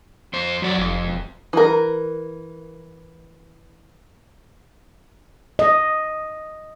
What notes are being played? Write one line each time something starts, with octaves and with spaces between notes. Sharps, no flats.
F2 C5
F2 F#3 D5
F1 F2
E1
E3 A#4
D#5